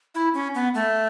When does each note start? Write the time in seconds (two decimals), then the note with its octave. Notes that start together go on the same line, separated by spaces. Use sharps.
0.15 E4
0.34 C#4
0.55 B3
0.75 A3